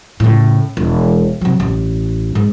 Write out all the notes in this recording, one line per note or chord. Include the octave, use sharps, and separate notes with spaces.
A2 C#3
E1
C3 F#3
A1
G#2